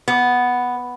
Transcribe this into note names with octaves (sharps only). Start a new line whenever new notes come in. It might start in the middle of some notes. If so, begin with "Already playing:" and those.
B3